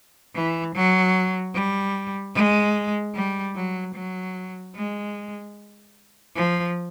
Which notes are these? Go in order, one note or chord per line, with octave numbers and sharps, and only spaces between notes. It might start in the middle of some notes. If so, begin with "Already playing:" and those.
E3
F#3
G3
G#3
G3
F#3
F#3
G#3
F3